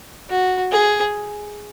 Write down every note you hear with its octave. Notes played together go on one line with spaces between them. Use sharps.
F#4
G#4